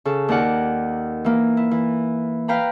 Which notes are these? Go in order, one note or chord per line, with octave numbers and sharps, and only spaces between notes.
C#3 A4
D#2 A#4 D5 F#5
E3 A#3
E4
E3
B4 F5 G5 A#5 B5